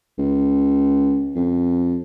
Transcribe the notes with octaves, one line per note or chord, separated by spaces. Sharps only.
C#2
F2